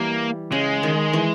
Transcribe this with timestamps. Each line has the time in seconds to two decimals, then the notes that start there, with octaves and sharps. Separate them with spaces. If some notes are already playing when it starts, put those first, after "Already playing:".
Already playing: E3 G3 A#3
0.52 C#3 G#3
0.83 D#3
1.13 E3